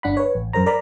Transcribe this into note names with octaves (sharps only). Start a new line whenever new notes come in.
G1 D4 F#5 B5
B4 C#5
A1
F#2 A#4 C5 A#5
A#4 D5 A#5 B5